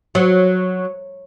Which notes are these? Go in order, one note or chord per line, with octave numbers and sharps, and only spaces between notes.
F#3